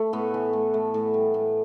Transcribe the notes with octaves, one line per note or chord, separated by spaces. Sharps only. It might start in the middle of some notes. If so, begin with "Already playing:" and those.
Already playing: A3
A2 B3
E3
A2
A3
A2
G3
A2